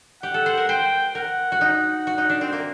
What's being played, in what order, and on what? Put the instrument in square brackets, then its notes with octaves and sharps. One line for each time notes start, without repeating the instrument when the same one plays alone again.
[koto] G4 [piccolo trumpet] F#5
[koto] A4
C5
A#4
[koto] C5 [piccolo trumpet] G5
[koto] A#4 [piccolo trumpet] F#5
[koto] F#4
[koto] D#4 [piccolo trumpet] F#5
[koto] F#4
D#4
D4
C4
A#3